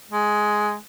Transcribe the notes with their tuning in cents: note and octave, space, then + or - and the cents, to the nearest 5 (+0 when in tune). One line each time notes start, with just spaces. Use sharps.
G#3 +10